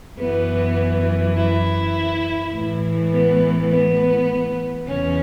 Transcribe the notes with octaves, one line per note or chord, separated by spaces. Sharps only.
F#2 E3 B3
E4
A2 E3
B3
B3
E2 C#3 E3 C#4